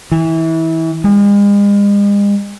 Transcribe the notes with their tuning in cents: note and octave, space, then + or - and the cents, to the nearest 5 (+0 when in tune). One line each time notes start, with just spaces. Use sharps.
E3 -25
G#3 -40